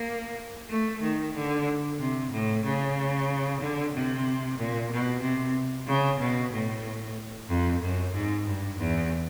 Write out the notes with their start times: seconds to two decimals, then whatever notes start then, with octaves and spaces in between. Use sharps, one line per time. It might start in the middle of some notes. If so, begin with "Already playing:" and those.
Already playing: A#3
0.69 A3
1.02 D#3
1.35 D3
1.99 C3
2.32 A2
2.65 C#3
3.60 D3
3.93 C3
4.57 A#2
4.91 B2
5.22 C3
5.87 C#3
6.19 B2
6.53 A2
7.49 F2
7.81 F#2
8.14 G#2
8.46 G2
8.79 E2